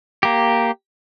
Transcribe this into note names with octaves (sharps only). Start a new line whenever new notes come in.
A#3 G4